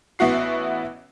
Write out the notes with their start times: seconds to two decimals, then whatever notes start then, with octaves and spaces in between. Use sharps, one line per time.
0.19 A1 B3 E4 F#4 C7